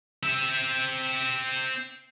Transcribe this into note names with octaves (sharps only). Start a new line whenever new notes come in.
C4 E5